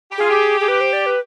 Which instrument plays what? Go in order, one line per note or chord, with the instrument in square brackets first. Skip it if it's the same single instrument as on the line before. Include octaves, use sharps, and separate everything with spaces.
[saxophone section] G4
[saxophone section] F4 [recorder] G#4
[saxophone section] G4
[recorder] G#4
B4
C5
D5
B4